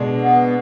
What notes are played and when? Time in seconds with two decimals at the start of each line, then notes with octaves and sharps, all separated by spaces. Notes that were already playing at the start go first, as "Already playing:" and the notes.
Already playing: B2 G#3 D4
0.21 B3